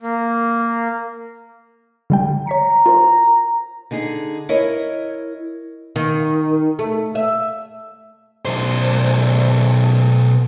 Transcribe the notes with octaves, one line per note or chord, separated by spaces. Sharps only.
A#3
D3 G3 G5
C#5 A#5 B6 C#7
F4 A#4 C5
D3 D#4 G#4
E4 A#4 C#5 D#5
D#3
A3
E5
B1 C5